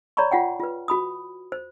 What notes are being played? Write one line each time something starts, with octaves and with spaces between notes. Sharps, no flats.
C#5 D5 A#5 B5 C#6
F4 F#5 G5
F4 B4
F#4 B5 D#6
C5